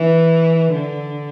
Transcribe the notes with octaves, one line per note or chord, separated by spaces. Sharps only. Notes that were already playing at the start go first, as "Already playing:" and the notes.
Already playing: E3
D3